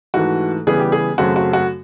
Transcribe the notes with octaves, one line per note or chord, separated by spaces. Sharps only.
G#2 E3 A3 F#4
C#3 E3 G3 B3 G#4
G4
G#4
F#2 C#3 F#3 A3 C4 F#4
F#4
F#4